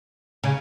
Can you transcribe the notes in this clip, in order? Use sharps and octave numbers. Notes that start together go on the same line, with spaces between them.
C#3